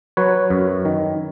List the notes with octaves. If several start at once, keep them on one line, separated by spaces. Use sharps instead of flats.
F#3 B4 C#5
F#2
D#3